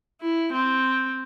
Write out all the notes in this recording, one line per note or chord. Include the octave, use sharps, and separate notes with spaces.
E4
C4